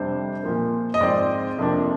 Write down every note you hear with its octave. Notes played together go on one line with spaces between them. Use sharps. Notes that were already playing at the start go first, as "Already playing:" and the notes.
Already playing: F2 C3 G3 D4 C5
A#2 F3 A#3
D#5
G#2 F3 C4 D#4 D5
F2 C3 F3 A#3 D4